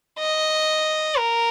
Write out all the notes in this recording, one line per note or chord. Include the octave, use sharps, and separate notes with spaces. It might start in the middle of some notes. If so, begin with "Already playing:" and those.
D#5
A#4